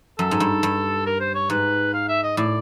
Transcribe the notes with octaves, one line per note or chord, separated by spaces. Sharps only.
F#2 A4
G#2
G2
G2
A#4
C5
C#5
G#2 B4
F5
E5
D#5
A2 D5